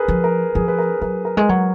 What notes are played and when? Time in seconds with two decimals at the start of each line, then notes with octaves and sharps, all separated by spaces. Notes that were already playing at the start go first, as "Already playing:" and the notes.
Already playing: G#4 A#4 B4
0.08 F3
0.24 A#4
0.55 F3 G#4
0.68 B4
0.79 A#4
1.02 F#3 A#4
1.25 A#4
1.37 G#3
1.49 F#3